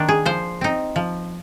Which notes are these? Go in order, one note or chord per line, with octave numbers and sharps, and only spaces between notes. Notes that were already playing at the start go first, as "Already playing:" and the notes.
Already playing: D#3 A#3 D4
G#4
F3 C5
C4 D#4
F3